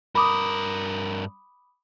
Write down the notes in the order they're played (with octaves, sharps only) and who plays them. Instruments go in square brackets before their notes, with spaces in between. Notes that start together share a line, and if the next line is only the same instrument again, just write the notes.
[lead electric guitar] G2 A#4 [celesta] B5 D6 D#6